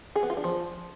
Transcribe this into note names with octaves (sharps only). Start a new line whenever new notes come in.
G#4
B3
F4
D4
F3